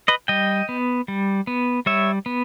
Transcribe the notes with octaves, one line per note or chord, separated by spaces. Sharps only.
B4 D#5
G3 D#5 G5
B3
G3
B3
G3 C#5 E5
B3